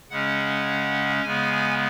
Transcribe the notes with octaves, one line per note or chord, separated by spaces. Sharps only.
C#3 G#3 C#4 F#5
C#3 G#3 B3 G#5